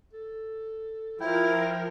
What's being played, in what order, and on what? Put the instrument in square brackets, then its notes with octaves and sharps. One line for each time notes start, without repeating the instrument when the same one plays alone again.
[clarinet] A4
[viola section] F3 A#4 [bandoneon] E4 [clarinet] G5